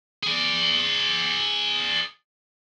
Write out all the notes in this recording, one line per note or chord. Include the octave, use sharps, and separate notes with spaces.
G#4 D5